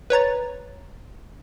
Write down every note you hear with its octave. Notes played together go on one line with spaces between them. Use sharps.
B4 C#5 A#5 A6